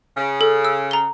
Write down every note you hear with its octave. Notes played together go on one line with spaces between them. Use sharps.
C#3
A4
E6
A#5 G7